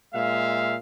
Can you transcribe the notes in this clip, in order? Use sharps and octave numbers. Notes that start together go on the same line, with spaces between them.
A#2 G#3 E5 F5